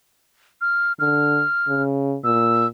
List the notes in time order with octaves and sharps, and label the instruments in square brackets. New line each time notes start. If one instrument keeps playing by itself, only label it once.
[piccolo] F6
[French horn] D3 [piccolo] F6
[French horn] C#3
[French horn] A#2 [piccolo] E6